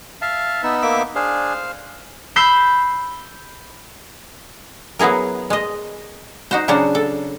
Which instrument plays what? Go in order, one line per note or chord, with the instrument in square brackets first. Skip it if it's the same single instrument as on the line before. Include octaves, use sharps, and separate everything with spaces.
[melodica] E5 A5 [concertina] F5
[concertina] B3 D#4 E6
[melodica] A#3 E5 D6
[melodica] D4 G#4 [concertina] C5 F5
[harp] B5 E6 G6 C7
[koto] F#3 B3 E4 G#4 A#4
G#3 D#5
D#4 F#4 C5
C#3 F#3 C#4 D4 C5
A4